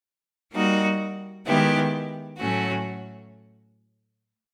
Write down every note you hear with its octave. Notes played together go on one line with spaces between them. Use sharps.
G3 A#3 D#4 F#4
D#3 G#3 B3 E4 G4
A2 F#3 A3 C#4 F#4